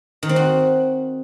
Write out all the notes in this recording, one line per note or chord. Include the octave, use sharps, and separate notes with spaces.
D#3
C4
F#4